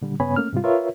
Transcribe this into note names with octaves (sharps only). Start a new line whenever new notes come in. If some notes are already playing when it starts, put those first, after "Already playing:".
A#2 D3 G3
G2 C#3 B3 C#5 G#5 B5
A3 A#3 C#4 F6
G#2 C3 G3 F4
F4 A#4 B4 C#5 E5